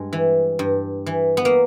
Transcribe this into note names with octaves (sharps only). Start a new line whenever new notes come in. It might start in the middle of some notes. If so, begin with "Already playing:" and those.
Already playing: G2 G#3
E3
G2
E3
B3
A#3